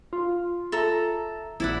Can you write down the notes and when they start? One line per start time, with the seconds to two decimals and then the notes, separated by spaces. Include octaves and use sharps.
0.13 F4
0.72 A4 E5 A#5
1.60 A#1 E4 D5 F#5